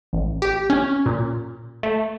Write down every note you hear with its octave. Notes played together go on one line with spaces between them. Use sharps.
A1
G4
C#4
A#2
A3